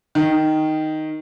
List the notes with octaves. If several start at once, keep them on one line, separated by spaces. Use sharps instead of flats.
D#3